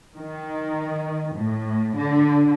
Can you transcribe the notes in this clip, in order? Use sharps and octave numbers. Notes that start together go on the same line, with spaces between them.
D#3
A2
D3